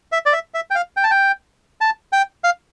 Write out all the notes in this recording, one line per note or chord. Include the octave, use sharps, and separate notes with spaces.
E5
D5
E5
E5
G5
F5
G5
A5
G5
A5
G5
F5